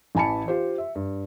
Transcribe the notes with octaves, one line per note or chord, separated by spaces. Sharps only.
A1 E3 G#5 A5 B5 C#7
F4 G4 C5
E5
G2